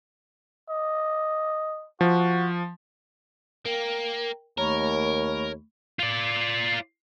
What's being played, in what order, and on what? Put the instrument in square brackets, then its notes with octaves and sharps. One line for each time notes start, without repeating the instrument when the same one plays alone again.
[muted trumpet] D#5
[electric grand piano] F3 [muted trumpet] F#4
[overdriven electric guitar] A#3 [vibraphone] A#4 G5
[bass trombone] D#2 [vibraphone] A3 B5 C#6 [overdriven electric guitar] A#4 [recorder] C#5
[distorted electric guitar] F4 D5